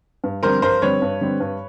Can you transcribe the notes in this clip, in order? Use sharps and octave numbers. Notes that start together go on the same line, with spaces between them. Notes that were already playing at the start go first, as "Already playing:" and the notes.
G2
D3 G3 C4 A#4 C5
G2 A#4 C5
D3 G3 C4 B4 C#5
G2
D3 G3 C4
G2